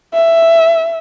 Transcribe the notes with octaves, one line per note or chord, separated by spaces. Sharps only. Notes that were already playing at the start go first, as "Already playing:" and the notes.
E5